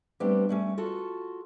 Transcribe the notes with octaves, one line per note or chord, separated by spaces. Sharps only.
G3 A3 B3 C4 D4 G4
G3 A3 C#4
F4 F#4 A4 A5